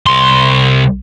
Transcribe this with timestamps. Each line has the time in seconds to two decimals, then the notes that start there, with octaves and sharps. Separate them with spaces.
0.07 C2 C6